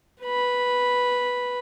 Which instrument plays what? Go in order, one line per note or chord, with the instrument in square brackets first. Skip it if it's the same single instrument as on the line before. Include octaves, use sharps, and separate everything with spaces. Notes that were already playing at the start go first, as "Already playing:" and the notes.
[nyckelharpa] B4 B5